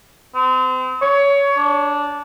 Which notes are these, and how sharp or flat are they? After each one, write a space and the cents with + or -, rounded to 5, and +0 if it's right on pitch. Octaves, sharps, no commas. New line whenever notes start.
C4 -35
C#5 +20
D4 -10